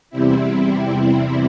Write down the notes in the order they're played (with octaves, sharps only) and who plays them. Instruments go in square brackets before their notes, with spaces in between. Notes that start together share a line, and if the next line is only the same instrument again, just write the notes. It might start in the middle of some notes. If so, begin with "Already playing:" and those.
[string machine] E2 C3 G3 C4 E4